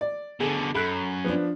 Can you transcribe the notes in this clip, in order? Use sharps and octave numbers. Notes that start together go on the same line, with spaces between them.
D5
B2 D3 G#4 A4 G#5
F#2 A4 B5 F#6
F3 B3 D4